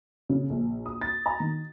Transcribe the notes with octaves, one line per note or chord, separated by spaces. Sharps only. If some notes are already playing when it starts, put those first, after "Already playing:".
C#3
A#1
D#6
A6
A#5
D#3